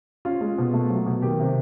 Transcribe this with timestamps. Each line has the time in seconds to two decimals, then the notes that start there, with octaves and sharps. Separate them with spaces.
0.25 C#4 F4
0.41 G#3
0.58 B2
0.73 A3
0.90 F#3
1.06 B2
1.22 D#3 G4
1.40 C3